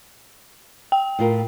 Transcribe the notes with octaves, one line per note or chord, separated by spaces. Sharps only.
G5
A2 F4 A#4